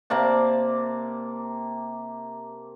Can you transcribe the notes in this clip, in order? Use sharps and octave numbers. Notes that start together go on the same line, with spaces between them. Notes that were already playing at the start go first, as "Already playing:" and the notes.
C3 A#3 D5 A5